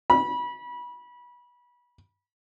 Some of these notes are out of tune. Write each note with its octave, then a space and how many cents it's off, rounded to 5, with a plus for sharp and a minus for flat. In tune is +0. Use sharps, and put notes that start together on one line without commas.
B5 -25